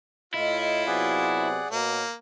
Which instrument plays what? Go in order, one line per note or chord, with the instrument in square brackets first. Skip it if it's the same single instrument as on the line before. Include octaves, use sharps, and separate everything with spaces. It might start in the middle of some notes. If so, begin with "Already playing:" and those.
[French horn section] A2 D#5 [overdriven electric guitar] E4 [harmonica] F4
[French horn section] C3 F#3 B3 [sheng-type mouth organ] G#4 D5 F#5
[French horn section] B2 C#5 [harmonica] A#3